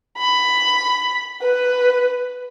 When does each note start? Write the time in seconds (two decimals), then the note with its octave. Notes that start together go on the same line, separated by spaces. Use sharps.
0.18 B5
1.42 B4